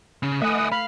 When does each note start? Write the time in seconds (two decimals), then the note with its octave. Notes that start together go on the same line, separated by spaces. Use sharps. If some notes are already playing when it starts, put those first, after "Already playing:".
0.23 C#3
0.42 A3 D#5 E5 F#5 G#5 D#6
0.72 F5 B5